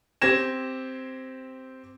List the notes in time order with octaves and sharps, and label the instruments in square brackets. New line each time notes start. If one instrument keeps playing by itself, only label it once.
[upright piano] C4 G4 C5 G#6 A#6 E7